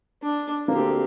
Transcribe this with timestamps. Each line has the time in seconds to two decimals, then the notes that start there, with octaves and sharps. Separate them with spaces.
0.22 D4
0.68 D2 A#3 C4 G4